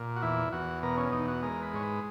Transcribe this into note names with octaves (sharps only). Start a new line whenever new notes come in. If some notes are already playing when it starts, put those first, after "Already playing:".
Already playing: A#2
F#4
E2 E4
E2 F#4
B2 A#4
C#4
E2 D#4
F#4
G#3 A#4
B4
G#2 C#5
B4